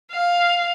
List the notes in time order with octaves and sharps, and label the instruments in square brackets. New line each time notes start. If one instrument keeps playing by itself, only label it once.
[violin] F5